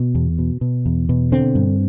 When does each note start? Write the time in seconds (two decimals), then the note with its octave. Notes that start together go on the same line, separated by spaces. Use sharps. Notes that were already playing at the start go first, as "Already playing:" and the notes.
Already playing: B2
0.15 E2
0.39 B2
0.61 B2
0.86 E2
1.09 B2
1.32 D3 C4
1.55 G2